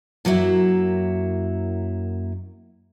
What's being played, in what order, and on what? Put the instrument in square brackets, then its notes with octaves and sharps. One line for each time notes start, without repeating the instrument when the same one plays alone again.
[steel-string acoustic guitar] F#2 F#3 A#3 E4 E5